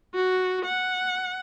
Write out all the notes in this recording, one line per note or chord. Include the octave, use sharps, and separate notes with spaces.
F#4
F#5